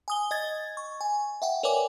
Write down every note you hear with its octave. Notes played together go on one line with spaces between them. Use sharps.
G#5 D#6 G7
D#5 G#6 A6
C#6
G#5
E5 F#5 G5
A#4 B4 C#5 D5 G#5 D6